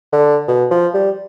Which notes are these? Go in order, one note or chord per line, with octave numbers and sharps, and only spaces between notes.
D3
B2
F3
G3